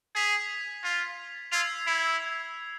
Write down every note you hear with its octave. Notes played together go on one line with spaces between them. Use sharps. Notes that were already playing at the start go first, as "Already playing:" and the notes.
G#4 G#6 B6 F7
F4
F4 E6 G#6 C7 F7
E4